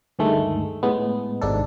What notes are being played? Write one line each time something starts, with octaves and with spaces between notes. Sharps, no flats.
D2 G2 D#3 G#3 A3
A2 G#3 B3
G#1 G#2 C3 D4 D#4 A4